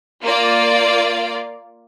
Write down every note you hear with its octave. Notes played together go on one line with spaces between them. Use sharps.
A#3 F4 D5 F5